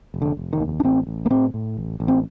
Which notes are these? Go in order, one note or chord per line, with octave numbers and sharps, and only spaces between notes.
F1
D3
F1
D#3
D#2
D4
A1 C4
A1
A#3
A2 C4
A2
A1
A1
C4